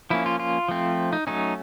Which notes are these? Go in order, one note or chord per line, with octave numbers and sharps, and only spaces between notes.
F3 A#3 C#4 E4
F4
F4
F3 A3 C4
D#4
F#3 A3 C#4 D#4